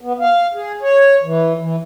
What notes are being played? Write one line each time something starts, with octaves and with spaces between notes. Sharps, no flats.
B3
F5
G#4
C#5
E3
E3